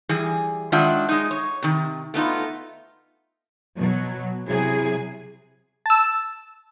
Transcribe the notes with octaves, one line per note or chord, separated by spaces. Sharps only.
E3 G3 G#4
D#3 G#3 D4 F4 E5 F#5
G#3 D#4
C#5
C3 D#3
A3 B3 D#4 F4
B2 F#3
C3 F#3 E4 G#4
A5 E6